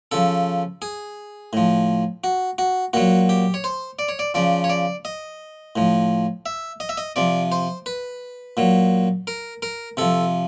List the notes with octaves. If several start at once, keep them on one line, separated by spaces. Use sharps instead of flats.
C#3 F3 A4
G#4
A2 F3
F#4
F#4
A#2 F#3 F#4
G4
C#5
C5
D5
C#5
D5
C#3 F3 D5
C#5
D5
D#5
A2 F3
E5
D#5
E5
D#5
C3 F3 D5
C5
B4
A#2 F#3
A#4
A#4
C3 F3 A4